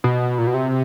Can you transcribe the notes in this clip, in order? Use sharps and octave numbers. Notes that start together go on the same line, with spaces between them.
B2
A#2
B2
C3